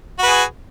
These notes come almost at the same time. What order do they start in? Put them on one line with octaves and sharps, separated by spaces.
F#4 B4 G#4